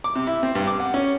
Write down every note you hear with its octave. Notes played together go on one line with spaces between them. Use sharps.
D6
C3
E4
C4
G2
D6
F#5
C#4